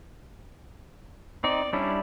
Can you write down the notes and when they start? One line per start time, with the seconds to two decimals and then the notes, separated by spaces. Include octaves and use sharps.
1.44 C4 D#4 D5
1.73 G3 C#4 D4 E4